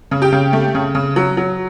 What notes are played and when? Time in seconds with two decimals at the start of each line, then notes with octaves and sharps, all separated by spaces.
0.11 C#3
0.22 G4 G5
0.32 C#3
0.53 A3
0.75 C#3
0.95 C#3
1.16 F#3
1.37 F#3